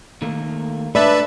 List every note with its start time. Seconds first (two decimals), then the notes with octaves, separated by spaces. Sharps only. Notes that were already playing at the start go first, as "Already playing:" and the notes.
0.22 D#3 A3 A#3
0.95 A3 D4 B4 D5 E5 A5